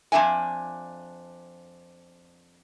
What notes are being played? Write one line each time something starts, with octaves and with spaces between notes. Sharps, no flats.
F2 G3 D4 E5 G#5